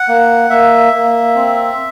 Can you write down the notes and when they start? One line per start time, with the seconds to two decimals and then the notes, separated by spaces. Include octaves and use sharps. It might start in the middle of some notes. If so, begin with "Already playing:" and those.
Already playing: F#5
0.08 A#3
0.50 A#3 E5
0.93 A#3
1.35 C4